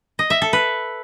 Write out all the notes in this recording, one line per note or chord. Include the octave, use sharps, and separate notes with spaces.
D#5
E5
A4
B4